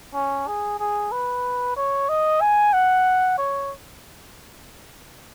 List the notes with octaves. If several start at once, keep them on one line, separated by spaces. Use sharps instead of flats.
C#4
G#4
G#4
B4
C#5
D#5
G#5
F#5
C#5